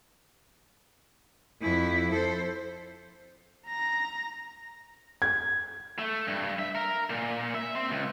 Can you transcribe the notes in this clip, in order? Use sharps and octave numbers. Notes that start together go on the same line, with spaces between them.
F2 E4
A4 C5
A#5 A#6
G#6
A3
G2
E5
A#4
A#2
E5
C4
C#2